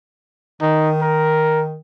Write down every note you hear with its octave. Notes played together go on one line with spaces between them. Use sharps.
D#3 D#4
A#4